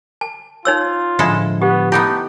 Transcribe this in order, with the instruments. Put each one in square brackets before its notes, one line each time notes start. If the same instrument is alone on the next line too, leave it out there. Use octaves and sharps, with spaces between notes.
[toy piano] A5
[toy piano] D#4 C#5 E6 [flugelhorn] F4
[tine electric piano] A2 D3 F3 [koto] G#3 E4 A4
[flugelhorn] B3 [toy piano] G4
[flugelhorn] A3 [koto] B3 D#4 G4 [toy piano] E4